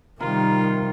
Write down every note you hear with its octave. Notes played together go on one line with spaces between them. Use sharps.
C3 D#3 G3 F4 A#4